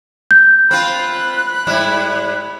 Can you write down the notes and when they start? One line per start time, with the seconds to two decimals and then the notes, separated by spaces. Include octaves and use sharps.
0.31 G6
0.71 C4 F4 B5 F#6
1.67 G#2 G3 E4